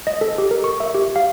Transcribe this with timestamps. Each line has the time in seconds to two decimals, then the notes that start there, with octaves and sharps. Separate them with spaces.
0.07 D#5
0.21 A4
0.38 G4
0.51 A#4
0.64 C#6
0.80 E5
0.95 G4
1.16 F5